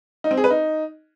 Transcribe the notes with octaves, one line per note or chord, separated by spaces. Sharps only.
D#4
C4
G#4
B4
D#4